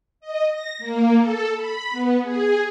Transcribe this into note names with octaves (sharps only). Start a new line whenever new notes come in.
D#5
A#6
A#3
A4
B5
B3
G#4